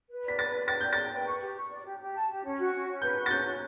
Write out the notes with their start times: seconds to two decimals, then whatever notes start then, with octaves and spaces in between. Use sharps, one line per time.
0.10 B4
0.24 D5 B6
0.39 B4 A6
0.54 D5
0.68 G5 A6
0.80 D5 G6
0.93 A6
0.98 G5
1.12 B4
1.26 C#6
1.41 G4
1.56 C#6
1.70 D5
1.85 G4
2.00 G4
2.15 A5
2.29 G4
2.44 C#4
2.58 F#4
2.73 C#4
2.88 C#4
3.02 B4 G6
3.17 F#4
3.26 A6
3.30 C#4 G6
3.45 C#4